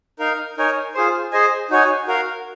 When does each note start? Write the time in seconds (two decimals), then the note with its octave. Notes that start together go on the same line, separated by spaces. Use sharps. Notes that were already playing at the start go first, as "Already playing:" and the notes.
0.19 D#4 A#4 F5
0.57 D#4 A#4 C#5 G#5
0.95 F4 G#4 C5
1.32 G#4 C5 D#5 G#5
1.70 D#4 F#4 C#5 G#5
2.07 F#4 A#4 F5